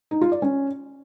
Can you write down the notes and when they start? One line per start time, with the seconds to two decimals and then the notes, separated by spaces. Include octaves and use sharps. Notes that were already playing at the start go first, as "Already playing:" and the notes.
0.11 D#4
0.21 F4
0.32 D5
0.42 C#4